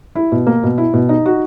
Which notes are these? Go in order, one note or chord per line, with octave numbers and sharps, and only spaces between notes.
E4
B2
A#3
B2
E4
B2
D#4
F#4